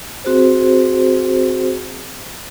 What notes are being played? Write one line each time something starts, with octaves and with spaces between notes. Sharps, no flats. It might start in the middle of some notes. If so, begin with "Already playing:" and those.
C4 F#4 G#4 C5